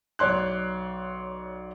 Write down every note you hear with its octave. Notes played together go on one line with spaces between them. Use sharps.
B1 C#5 D5 C6 F#6